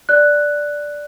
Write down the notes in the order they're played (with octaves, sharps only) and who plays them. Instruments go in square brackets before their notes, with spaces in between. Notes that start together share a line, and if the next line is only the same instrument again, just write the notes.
[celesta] D5 F#6